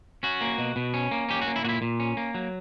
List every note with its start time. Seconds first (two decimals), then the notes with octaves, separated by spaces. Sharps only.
0.23 C#4 F#4
0.41 A#3
0.58 B2
0.76 B2
0.94 C#4
1.11 A#3
1.29 C#4 G4
1.42 F#4
1.47 A#3
1.56 E4
1.64 A#2 F#4
1.69 E4
1.82 A#2
2.00 C#4
2.17 A#3
2.34 F#3